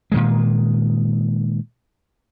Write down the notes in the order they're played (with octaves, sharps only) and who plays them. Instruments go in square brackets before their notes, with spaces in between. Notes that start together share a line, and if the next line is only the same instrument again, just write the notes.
[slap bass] A#2 D#3 G#3